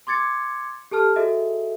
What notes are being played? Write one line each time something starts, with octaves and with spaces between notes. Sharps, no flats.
C6 D6 G#6 A6 C#7
G4 A4 A5 F6
F#4 G#4 A4 D#5 E5